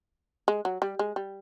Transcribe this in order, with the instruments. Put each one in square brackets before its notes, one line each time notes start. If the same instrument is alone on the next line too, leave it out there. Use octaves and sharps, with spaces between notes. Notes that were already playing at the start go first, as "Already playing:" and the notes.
[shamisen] G#3
F#3
G3
G#3
G3